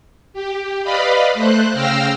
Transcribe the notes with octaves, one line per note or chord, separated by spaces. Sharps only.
G4
B4 D5 D#5 F5 B5
A3 C5 F#6
C#3 F5 G5 E6 F6 A#6